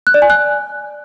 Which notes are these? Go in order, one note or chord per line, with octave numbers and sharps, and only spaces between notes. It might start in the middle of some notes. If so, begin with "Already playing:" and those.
F#6
D5
G#5
F#6